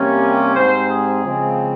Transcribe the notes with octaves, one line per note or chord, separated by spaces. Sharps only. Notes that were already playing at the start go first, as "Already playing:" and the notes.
Already playing: C3 G3 A#3 C#4
G#2 G3 C4 C5
G#4
C#3 F3 G#3 C4